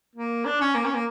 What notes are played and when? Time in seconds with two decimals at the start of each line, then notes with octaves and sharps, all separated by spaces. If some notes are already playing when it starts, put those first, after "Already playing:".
0.16 A#3
0.45 D4
0.61 C#4
0.75 A#3
0.85 C#4
0.94 A#3